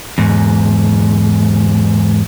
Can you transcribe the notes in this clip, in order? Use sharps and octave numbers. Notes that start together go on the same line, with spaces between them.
E2 G#2